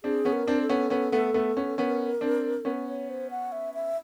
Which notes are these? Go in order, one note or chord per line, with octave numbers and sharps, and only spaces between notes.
C4 D4 G#4
B3 C#4
A#4
C4 D4
A4
B3 C#4
B3 C#4
A3 B3
A3 B3
B3 C#4
B3 C#4 A#4
C4 D4
B3 C#4
C#5
C5
F#5
E5
E5